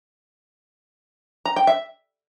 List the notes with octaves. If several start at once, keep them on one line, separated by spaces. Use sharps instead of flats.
A#5
G5
E5